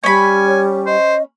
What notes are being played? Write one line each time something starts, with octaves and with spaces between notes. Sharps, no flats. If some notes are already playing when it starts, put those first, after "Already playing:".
G3 C#4 G#5 B5
C#5
C5 D#5